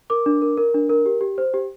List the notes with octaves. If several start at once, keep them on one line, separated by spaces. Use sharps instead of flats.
A#4 D6
D4
A#4
A#4
D4
A#4
G4
G4
C5
G4